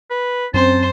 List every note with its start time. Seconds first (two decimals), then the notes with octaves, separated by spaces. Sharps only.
0.10 B4
0.54 F#2 C4 C#4 C5 A5